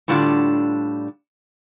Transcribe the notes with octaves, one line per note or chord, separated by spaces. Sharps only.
A2 D3 G3 D4 F4